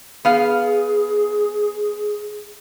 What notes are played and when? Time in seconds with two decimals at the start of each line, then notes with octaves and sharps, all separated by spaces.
0.25 B3 G#4 F5